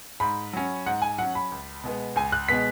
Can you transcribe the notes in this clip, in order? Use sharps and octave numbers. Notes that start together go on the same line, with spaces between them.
G#2 B5
F#3 C#4
G#2 F#5
G#5
F#3 C#4 F#5
B5
C#2
B2 G#3 B3
C#2 G#5
F#6
B2 G#3 B3 B6